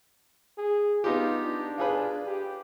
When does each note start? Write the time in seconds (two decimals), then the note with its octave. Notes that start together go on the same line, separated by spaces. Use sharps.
0.58 G#4
1.04 B3 D#4 F4 G4
1.44 D4
1.78 F4 G#4 B4
2.27 G4